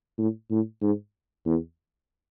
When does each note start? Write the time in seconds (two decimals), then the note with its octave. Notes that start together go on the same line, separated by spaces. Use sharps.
0.18 A2
0.50 A2
0.81 G#2
1.46 E2